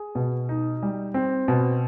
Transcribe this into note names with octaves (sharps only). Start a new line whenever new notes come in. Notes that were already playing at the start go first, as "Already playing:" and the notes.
Already playing: G#4
B2
D#4
G3
C4
B2